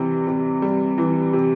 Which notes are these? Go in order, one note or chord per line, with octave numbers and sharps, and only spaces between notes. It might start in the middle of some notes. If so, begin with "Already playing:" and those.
Already playing: C3 E3 G3
C3
G3
E3
C3